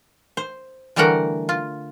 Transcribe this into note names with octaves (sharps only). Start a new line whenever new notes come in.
C5
D3 E3 G3 A3 A#4 F#5
F4